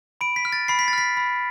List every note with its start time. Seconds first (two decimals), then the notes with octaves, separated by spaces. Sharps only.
0.21 B5 D7
0.36 B6
0.45 F6
0.52 A6
0.68 B5 C7
0.79 B6
0.88 A6
0.93 F6 B6
1.17 B5